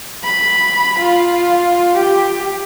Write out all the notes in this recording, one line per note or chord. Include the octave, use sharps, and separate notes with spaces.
B5
F4
G4